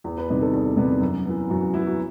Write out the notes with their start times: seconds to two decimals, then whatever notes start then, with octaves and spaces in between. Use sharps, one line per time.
0.04 E2
0.18 B4
0.29 C3 D#3 G3 B3 B4
0.41 A4
0.53 E2
0.77 C3 D#3 G3 B3
1.01 F#2
1.25 E3 B3
1.50 F#2 F#4
1.61 F#4
1.74 E3 B3 E4
1.86 F#4